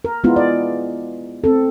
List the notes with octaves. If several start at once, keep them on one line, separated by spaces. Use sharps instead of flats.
A#4
G#3 B3 E4 F4
D5
C4 A4